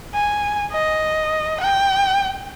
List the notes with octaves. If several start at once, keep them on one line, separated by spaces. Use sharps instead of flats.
G#5
D#5
G5